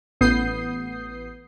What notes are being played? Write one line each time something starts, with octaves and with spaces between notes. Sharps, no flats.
A1 B3 D#6 G6 C7